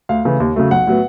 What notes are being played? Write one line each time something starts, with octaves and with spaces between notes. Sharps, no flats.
D2 F5
C#3 E3 A3 C#4
D#2
C#3 F#3 A3
B1 F#5
A2 F#3 B3